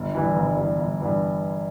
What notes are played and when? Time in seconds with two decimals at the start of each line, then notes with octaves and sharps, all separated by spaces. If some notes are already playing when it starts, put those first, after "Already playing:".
Already playing: G1
0.15 G2 E3
0.36 G1
0.57 G2 E3
0.78 G1
1.00 G2 E3